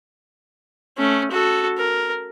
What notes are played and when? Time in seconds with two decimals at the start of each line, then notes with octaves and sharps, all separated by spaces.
0.98 A3 C#4
1.31 F#4 A4
1.78 A#4